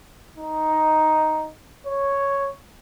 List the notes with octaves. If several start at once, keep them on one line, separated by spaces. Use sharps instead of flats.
D#4
C#5